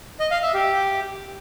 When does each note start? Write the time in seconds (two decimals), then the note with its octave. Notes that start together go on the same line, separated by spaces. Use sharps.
0.20 D#5
0.31 F5
0.42 E5
0.54 G4